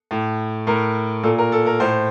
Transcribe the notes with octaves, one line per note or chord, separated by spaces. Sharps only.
A2
A2 A#4
A#2 A4
A#4
A4
A#4
A2 C5